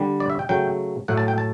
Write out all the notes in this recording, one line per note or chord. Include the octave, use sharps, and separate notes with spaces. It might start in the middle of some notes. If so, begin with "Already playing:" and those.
Already playing: D3 G3
D5
E5
G5
C#3 F#3 A3 G5
A2 F#3 A3 F#5
A5
G5
A5